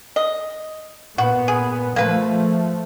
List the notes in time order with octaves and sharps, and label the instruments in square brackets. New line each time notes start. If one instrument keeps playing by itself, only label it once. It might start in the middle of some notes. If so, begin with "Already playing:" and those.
[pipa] D#5
[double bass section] A#2 B3 [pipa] F#4
[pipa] G#4
[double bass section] F3 A3 [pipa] A#3 B4